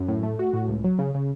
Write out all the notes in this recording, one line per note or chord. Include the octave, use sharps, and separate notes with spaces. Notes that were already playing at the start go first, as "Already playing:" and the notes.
Already playing: F#2
A2
A3
F#4
A2
C#2
F#3
C#3
C#3